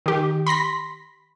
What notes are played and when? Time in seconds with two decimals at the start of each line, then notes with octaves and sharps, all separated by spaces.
0.06 D#3 G4
0.47 B5 C6 A#6 B6